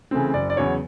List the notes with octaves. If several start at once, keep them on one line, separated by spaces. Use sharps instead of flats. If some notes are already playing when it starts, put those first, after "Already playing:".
C#3 E3 A3 C4
F#1 D5
D5
E2 C#3 F#3 C#5